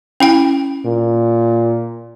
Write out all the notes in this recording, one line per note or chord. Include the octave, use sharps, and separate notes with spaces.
C#4 E4 G5
A#2